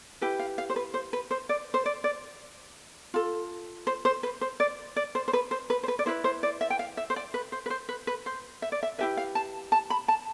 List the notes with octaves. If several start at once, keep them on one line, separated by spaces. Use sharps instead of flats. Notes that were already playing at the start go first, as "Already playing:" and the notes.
E4 G4 B4
F5
F5
C5
B4
C5
B4
C5
D5
C5
D5
D5
F4 A4
C5
C5
B4
C5
D5
D5
C5
C5
B4
C5
B4
C5
B4
D5
E4 B4 C5
C5
D5
E5
G5
F5
E5
C5
D5
B4
C5
B4
C5
B4
B4
C5
E5
D5
E5
E4 G4 B4 E5
F5
A5
A5
B5
A5